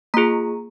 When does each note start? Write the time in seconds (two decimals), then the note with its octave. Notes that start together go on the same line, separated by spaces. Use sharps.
0.14 A#3 F4 G#4 A#5